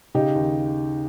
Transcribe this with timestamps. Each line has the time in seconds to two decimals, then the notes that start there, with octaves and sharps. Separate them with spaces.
0.14 C#3 D#4 G4
0.35 D#2